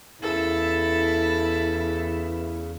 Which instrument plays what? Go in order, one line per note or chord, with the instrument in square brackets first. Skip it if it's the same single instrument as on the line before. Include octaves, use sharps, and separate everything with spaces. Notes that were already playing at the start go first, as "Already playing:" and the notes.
[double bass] E2 [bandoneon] C#3 [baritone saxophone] E4 [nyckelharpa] A4